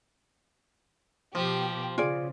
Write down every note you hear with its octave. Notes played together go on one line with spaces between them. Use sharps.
B2 F3 G4
C#3 F4 G#4 D5